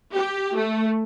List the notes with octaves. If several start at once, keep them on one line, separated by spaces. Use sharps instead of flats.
G4
A3